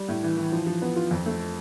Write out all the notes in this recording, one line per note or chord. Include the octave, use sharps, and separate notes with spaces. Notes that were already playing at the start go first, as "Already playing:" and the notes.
Already playing: G3
A2
E3
E3
F3
F3
B3
F4
F2
A3